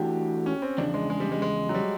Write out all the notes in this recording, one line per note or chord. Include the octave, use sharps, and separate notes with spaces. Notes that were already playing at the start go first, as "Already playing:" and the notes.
Already playing: E3 A3 D4 F#4 G4 A4
C#4
C4
E2 C#3 F3 D4
G#3
G#3
G3
G#3
G#3
F#3
G3